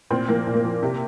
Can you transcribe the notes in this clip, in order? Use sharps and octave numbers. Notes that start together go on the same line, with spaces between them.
A#2 C4
F3 A#3
A#2
A#3
F3
C3